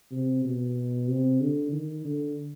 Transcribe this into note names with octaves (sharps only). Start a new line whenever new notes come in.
C3
B2
C3
D3
D#3
D3